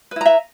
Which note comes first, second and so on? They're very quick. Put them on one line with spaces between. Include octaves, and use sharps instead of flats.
B4 E4 A#5 E5